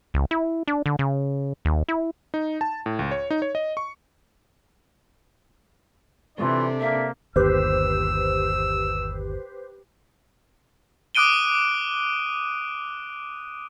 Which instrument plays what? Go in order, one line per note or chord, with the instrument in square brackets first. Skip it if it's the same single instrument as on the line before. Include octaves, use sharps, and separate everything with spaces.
[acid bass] C#2
E4
D4
D3
C#3
D#2
E4
[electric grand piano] D#4
A5
A2
C#2
C#5
D#4
C#5
D#5
C#6
[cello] C3 [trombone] E3 [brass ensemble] D4 A4 D5 [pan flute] F4
[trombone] A#3 [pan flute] E5
[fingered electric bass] G1 D#2 [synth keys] G4 B4 C5 [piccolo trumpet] E6
[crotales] D6 D#6 F#6 D7 D#7 G7